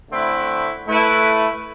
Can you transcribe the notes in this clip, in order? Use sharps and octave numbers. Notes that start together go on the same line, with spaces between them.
D3 A3 C4 E4 B4
A3 E4 B4